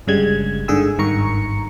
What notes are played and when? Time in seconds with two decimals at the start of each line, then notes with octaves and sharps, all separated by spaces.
0.07 G1 G2 C#3 G3 G#3 G#6
0.68 G1 G#2 D3 G#4 G#5 E6
0.98 G#1 G2 D#3 A#5 C#6 C#7